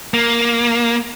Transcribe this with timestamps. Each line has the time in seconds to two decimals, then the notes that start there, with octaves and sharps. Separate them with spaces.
0.14 A#3